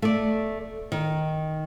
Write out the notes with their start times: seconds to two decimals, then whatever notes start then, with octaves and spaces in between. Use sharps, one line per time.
0.02 A3 D5
0.92 D#3